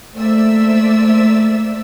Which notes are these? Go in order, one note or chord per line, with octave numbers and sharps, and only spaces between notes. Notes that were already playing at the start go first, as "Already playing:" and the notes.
A3 A#3 C5 D5 E5 E6